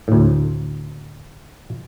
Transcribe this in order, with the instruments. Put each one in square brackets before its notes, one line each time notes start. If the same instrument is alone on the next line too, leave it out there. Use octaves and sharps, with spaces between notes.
[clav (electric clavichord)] D2 A2